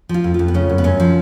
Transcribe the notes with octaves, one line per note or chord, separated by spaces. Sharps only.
F3 F4
F2
F2 F4
B3
C#3 C#4
F#2
B3
F#2 C#4
F3